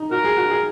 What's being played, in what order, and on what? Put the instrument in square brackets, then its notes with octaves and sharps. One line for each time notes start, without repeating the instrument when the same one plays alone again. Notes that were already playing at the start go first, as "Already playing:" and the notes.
Already playing: [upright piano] D#4
[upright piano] F#4 [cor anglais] A#4
[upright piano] G#4
F#4
G#4